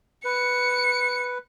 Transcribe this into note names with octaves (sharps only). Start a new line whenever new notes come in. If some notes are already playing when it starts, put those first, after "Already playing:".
B4 C#7